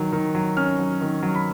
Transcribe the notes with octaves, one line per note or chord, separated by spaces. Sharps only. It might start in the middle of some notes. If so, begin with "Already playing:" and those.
Already playing: D#3 F#3
D#3
F#3
C#4 F6
F#3
D#3
F#3
B5